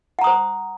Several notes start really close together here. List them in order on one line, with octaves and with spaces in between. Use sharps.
F#5 A#5 D#6 C5